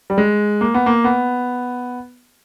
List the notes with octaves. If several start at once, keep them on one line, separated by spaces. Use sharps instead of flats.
G3
G#3
A#3
B3
A#3
B3